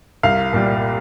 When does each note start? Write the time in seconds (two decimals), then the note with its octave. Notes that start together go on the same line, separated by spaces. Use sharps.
0.23 C2 F5
0.53 A#2 G3